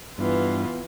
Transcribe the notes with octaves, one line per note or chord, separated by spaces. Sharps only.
G2 E3 B3 F4